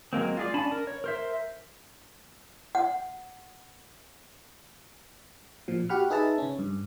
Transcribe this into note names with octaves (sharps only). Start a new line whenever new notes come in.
F#3 G#3 A#3 C4
F4 G#4 D5
C#4 D4 G#5 A5 B5
A#4
C#5
A#4 C5 E5
F#5
A#2 F3
F#4 G4 F#5 B5 F6
D#4 G#4 B4 E5 A5
C#3 C#4
G2